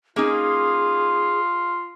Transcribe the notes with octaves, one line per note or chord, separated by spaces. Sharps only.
A#3 C#4 D#4 F4 G#4